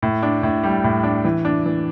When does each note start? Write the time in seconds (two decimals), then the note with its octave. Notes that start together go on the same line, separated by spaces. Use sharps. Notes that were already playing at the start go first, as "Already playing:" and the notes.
0.02 A2
0.23 D4
0.43 A2
0.63 G3
0.84 A2
1.04 D4
1.25 E3
1.45 D4
1.66 E3